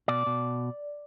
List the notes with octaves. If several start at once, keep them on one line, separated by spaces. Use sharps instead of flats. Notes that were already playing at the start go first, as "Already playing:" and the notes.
B2 D5
B2